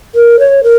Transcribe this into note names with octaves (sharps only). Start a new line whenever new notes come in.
A#4
C#5
A#4